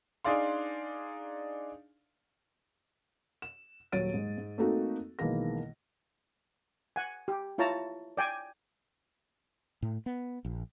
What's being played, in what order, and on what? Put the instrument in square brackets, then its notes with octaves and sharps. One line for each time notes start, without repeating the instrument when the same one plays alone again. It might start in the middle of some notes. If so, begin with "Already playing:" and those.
[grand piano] D4 D#4 G#4 D5 F5 C6
[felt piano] E7
D#1 F#3 C#5 A6 D7 D#7
G#2
G#2
A3 A#3 C4 D#4 F#4 A4
B1 D#3 E3 G#3 A#3 A#6
[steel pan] F#5 G#5
G4
E4 F4 C#5 A5 A#5
D5 G5 G#5
[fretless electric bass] A2
B3
A#1